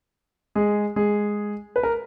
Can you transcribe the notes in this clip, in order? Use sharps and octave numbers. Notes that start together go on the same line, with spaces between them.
G#3 G#4
G#3 G#4
B4
A#4